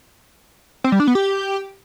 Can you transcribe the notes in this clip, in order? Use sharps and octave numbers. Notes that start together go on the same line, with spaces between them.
C4
G3
D4
B3
G4